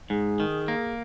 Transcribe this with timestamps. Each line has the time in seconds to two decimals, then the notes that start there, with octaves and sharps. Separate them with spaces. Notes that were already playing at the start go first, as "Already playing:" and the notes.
0.10 G#2 G#4
0.40 D#3
0.68 A#3